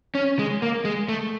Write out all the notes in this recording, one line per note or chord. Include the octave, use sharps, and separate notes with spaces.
C#4
G#3
A#3
G#3
A3